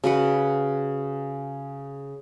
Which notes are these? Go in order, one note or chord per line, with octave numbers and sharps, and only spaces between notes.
C#3 F#4 B4 F#5